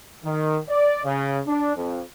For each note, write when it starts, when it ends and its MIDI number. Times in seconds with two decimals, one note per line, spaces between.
0.25 0.59 51
0.69 1.03 74
1.05 1.39 49
1.47 1.74 62
1.76 2.02 41